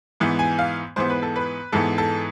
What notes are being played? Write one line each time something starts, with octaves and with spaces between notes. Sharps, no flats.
G#2 E3 B3
G#5
F5
G#2 E3 B3 C5
B4
A4
B4
G#2 E3 B3 A4
A4